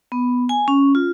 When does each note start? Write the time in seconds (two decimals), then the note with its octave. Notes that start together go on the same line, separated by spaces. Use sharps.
0.12 B3
0.49 G#5
0.68 C#4
0.95 F4